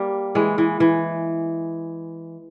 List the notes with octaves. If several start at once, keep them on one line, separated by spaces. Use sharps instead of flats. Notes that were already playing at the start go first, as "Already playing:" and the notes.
Already playing: G3 A#3
E3 G#3
E3
E3